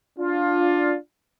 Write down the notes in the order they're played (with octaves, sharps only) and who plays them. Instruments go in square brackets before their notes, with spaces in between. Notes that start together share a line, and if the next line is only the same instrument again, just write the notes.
[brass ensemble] D4 F4